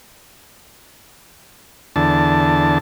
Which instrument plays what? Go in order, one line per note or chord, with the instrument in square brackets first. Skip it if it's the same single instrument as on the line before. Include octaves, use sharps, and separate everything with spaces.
[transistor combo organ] E2 D3 A5